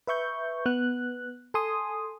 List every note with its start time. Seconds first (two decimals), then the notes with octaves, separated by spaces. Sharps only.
0.07 B4 E5 C#6 G6
0.66 B3 F#6
1.54 A4 G#5 C6 D#6